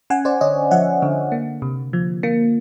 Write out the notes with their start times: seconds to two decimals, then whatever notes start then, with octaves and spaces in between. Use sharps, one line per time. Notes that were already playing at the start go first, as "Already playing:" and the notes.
0.10 C#4 F#5 G#5
0.25 C5 D5
0.41 D3 C#5 D#5
0.71 F3 E5 F#5
1.02 D3
1.32 A#3
1.62 C3
1.93 F3
2.23 A#3